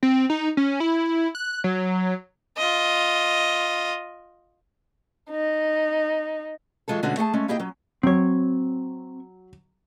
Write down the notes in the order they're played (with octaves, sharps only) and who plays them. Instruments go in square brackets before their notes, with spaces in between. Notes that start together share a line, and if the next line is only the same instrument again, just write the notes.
[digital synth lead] C4
D#4
C#4
E4
F#6
F#3
[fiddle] F4 D#5
[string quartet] D#4
[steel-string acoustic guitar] E3 F#3 G#3 F4 A4
B2 D3 G#3 A3 C#4 F#4
A3 G#4 F#5 A5
G#3 A3 C#4
A#3 E4 G4 G#4 D#5 G5
F#3 C#4
[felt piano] F#3 [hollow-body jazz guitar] C4 C#5